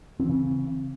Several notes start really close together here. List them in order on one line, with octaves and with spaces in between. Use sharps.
C4 E3 C#3